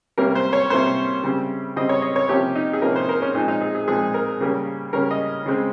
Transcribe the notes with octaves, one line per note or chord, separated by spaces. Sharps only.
C3 G3 A#3 C#4 A#4
C5
C#5
C3 G3 A#3 C#4 C5
C#3 G3 C4
C#3 G3 C4 D#5
C#5
D#5
C#5
C3 F3 A#3 C#4 G4
D#4
G#4
C3 F3 A#3 C#4 A#4
C5
A#4
C#4
A#2 F3 G#3 C4 D#4
D#4
G#4
G#4
A#2 F3 G#3 C4 G#4
A#4
C#3 G3 A#3 C#4
C#3 G3 A#3 C#4 A#4
D#5
C#3 G#3 C4